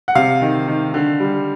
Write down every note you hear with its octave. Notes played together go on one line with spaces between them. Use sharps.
F#5
C3 F5
D#3
D#3
D3
G3